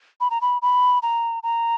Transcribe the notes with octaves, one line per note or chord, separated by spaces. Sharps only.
B5
A#5
B5
B5
A#5
A#5